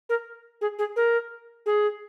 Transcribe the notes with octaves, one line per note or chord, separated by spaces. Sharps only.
A#4
G#4
G#4
A#4
G#4